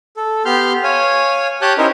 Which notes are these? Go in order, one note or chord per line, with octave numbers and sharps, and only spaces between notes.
A4
B3 G4 C6 F6 G6
C#5 F5 G#5
G4 C#5 A5 D6 F#6 G6
C#4 D#4 E4 G4 A#4 C5